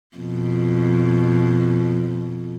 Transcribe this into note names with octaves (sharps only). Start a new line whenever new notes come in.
F2 B2